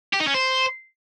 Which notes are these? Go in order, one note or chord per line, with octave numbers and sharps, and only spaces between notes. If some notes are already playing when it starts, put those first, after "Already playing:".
G4
D#4
C#4
C5